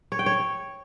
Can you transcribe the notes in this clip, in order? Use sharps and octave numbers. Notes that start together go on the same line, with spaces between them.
C#5
G5
C#5